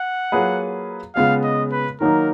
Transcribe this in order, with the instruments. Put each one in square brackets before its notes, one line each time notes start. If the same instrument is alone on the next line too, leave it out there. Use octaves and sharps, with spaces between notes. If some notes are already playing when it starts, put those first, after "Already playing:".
Already playing: [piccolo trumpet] F#5
[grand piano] F#3 A#3 F4 G#4 B4
[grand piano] C#3 G#3 B3 F4 G#4 [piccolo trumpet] F5
[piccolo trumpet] D#5
B4
[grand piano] D#3 F#3 A#3 D#4 [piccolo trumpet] A#4